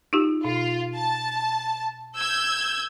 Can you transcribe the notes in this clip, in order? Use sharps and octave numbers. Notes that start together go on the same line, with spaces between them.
D#4 F4 G4
B2 F4
A5
E6 G6 G#6